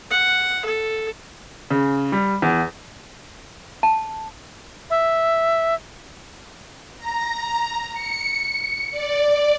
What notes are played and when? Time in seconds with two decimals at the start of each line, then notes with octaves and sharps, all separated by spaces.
0.11 F#5
0.65 A4
1.71 C#3
2.12 G3
2.42 E2
3.83 A5
4.90 E5
6.97 A#5
7.93 C#7
8.91 D5